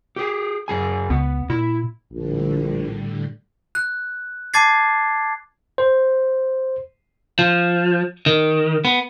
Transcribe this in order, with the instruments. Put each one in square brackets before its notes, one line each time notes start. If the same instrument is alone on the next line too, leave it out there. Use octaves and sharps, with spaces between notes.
[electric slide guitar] G4 G#4
F#2 G#4 G#5
[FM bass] C#2 [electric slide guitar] B3
[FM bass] A#2 [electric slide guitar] E4
[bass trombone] A#1 [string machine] A2 D3 G3
[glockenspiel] F#6
A5 D6 G#6 A6 C7
[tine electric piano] C5
[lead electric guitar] F3
D#3
B3